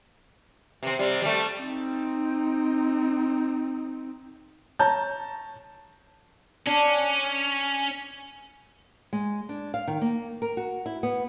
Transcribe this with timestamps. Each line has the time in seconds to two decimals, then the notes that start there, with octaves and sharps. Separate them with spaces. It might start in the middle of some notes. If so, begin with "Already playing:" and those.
0.83 C3 C4
0.99 C3 G3
1.22 G3 A3
1.63 C4 D#4
4.79 C#5 A5 A#5 G6
6.67 C#4 D4
9.13 G#3
9.49 D4
9.74 F5
9.88 D#3
10.01 A#3
10.42 A#4
10.57 F#4
10.86 E4
11.03 B3